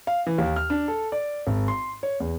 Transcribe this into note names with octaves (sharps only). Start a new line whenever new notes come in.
F5
E3
D#2
F6
D4
A4
D5
G#1
C6
C#5
E2